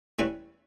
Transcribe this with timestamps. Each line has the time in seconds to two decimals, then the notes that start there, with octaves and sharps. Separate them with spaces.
0.19 E3 G3 C#4 E4 B4